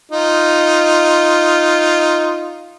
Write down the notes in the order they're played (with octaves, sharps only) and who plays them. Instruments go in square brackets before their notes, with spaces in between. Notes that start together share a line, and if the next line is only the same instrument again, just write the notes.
[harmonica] D#4 F4